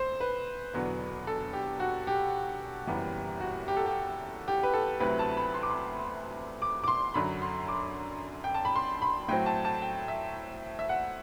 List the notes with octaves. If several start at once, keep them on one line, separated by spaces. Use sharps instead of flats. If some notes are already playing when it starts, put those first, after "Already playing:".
Already playing: D2 C5
B4
E1 E2 D3 F#3 B3
A4
G4
F#4
G4
F#1 F#2 E3 G3 B3
F#4
G4
A4
G4
G4
B4
A4
D2 C3 F#3 C4 E4 B4
A5
B5
C6
D6
C6
D6
D6
C6
F#2 D3 F#3 B5
C6
D6
G5
A5
B5
C6
B5
A2 F#3 C4 G5
A5
A5
G5
E5
E5
F#5